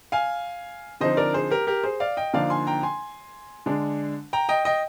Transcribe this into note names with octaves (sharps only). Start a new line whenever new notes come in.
F5 G#5
D3 F3 C4 D#4 C5 D#5
A#4 D5
G#4 C5
G4 A#4
G4 A#4
G#4 C5
D5 F5
D#5 G5
D3 F3 A#3 D#4 D5 F5
G#5 C6
G5 A#5
G#5 C6
D3 G#3 D4
G5 A#5
D#5 G5
D#5 G5